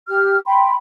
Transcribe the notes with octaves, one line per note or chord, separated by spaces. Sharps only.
G4 F6
G5 B5 C6